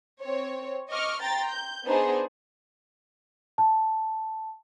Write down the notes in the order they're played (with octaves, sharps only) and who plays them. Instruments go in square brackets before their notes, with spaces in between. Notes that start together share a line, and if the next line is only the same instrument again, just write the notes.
[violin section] C4 C#5
D#5 C#6 D6 F6
G5 A#5 C6 A6
G6
B3 D4 D#4 G#4 C5
[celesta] A5